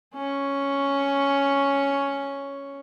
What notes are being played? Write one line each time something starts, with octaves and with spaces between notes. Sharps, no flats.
C#4 C#6